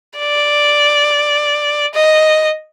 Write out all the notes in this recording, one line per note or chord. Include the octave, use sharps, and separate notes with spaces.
D5
D#5